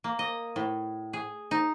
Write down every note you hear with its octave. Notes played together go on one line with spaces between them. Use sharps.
A#3
D#5
A2
G#4
D#4